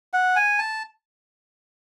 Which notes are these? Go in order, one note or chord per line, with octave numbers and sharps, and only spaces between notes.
F#5
G#5
A5